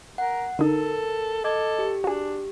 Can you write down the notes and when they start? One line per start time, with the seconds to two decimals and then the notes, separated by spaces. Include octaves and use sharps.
0.18 A#4 F#5
0.59 D3 D#4 A4 A#4
1.44 A4 D#5 D6 G#6
1.79 G4
2.04 D4 F#4 G#4